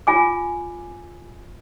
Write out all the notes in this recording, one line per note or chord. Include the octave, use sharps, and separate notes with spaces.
F4 G#5 D6